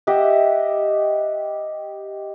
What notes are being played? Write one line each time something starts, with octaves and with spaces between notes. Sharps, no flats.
G4 D#5 E5 F#5